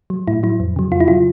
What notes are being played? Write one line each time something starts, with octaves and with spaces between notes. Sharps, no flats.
F#3
A2 E4
F#3 E4
F2
C#3 F#3
F2 F4
E4
C#3 F#3 F4